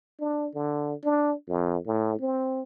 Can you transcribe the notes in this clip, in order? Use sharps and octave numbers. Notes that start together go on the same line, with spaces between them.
D4
D3
D4
F2
A2
C4